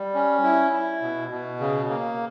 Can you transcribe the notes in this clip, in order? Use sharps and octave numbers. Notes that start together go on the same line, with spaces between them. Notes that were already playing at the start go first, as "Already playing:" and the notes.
Already playing: G3
C#4
E4
E4
B2
B2
C#3
A#3